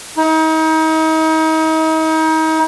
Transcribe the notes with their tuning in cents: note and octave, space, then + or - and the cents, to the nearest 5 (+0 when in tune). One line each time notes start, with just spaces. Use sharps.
D#4 +35